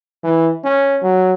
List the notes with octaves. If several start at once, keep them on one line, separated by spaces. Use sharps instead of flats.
E3
C#4
F#3